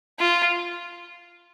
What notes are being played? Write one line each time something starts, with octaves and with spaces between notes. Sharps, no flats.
F4